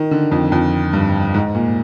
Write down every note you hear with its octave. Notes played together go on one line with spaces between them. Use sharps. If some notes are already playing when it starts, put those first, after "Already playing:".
Already playing: D#3
D3
F2
F2
G2
G#2
A#2